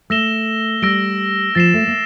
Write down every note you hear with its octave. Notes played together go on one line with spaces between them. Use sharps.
A3 E6 A#6 E7 G7
G3 E6 A#6 D7 G7
F3 A6 C7 E7
A3
A#3